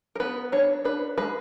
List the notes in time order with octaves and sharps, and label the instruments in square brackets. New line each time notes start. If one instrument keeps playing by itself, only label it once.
[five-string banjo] A#4
B3 B4
D4 C#5
D4 B4
G#3 B4